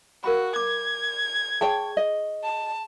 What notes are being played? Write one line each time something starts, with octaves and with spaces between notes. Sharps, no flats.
F#4 A#4 F5 B5
D6 G#6
G#4 C#5 G5 A5 C#6
D#5
A5